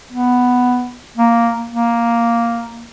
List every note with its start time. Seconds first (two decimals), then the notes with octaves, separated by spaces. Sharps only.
0.12 B3
1.17 A#3
1.69 A#3